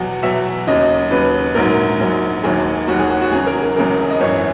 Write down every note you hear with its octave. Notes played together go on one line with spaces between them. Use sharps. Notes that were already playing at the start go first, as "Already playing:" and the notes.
Already playing: E2 B2 F#3 F#5
E2 B2 F#3 E5
D#2 C#3 F#3 D#5
D#2 C#3 F#3 B4
A#1 G#2 F#3 A#4
A#1 G#2 F#3
E1 D#2 D#3 F#3 G#4
E1 D#2 D#3 F#3 F#4
G#4
F#4
F#4
E1 E2 C#3 F#3 G#4
A#4
G#4
E1 E2 C#3 F#3 A#4
D#5
G#1 F#2 E3 C#5